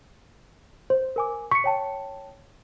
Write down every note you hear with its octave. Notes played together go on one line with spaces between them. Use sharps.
C5
A#4 G#5 D6
C#6 B6 C#7
C#5 G5 A5